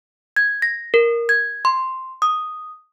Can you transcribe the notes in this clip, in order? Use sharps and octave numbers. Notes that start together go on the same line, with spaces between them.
G#6
A#6
A#4
G#6
C6
D#6